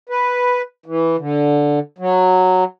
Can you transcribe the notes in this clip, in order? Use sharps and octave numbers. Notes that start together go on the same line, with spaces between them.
B4
E3
D3
F#3